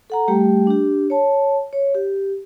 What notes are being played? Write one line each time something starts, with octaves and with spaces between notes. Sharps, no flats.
A4 F#5 A#5
G3 A3 G4 G5
D4 G4
C#5 A5
C#5
G4